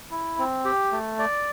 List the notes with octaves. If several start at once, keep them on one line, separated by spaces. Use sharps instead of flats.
E4
C4
G4
A3
D5